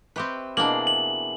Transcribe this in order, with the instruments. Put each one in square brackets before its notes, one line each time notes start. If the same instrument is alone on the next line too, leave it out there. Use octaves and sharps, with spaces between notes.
[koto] C4 G4 B4 [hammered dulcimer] E5 B5 C#6
[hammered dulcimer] B2 E3 G#4 [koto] A#3 D4 [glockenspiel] F#7
[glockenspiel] F#7